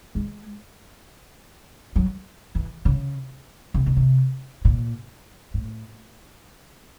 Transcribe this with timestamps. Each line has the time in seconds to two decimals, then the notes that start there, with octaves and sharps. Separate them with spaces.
0.15 G#3
1.96 F#3
2.55 E3
2.85 C#3
3.74 C3
3.86 B2
3.96 C3
4.65 A#2
5.54 A2